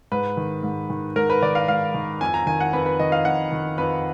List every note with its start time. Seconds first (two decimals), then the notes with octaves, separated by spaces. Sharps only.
0.12 G#2 B4
0.37 D#3
0.63 G#2
0.90 D#3
1.16 G#2 A#4
1.30 B4
1.42 D#3 D5
1.55 F5
1.68 G#2 F5
1.94 D#3
2.21 F2 G#5
2.34 A#5
2.46 D#3 G#5
2.60 F#5
2.73 F2 B4
2.86 B4
3.00 D#3 D#5
3.12 F5
3.25 F2 F#5
3.52 D#3
3.78 F2 B4